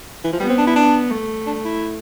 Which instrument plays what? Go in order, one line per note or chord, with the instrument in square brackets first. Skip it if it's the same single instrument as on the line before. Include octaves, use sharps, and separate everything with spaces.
[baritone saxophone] E3
F3
[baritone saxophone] G3 [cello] B3
[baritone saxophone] C4
D4
E4
D4
[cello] A3
[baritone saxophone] D4
E4